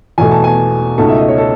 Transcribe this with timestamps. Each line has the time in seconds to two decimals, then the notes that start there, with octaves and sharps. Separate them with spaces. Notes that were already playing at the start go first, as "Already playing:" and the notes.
0.18 E2 B2 A3 G#5
0.31 A5
0.44 G#5
0.98 C#2 B2 A3 D#4 A5
1.09 E5
1.18 D#5
1.28 C#5
1.38 A4